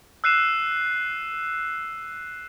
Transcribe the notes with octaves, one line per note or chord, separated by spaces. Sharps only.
E6 F#6 C7 D#7 E7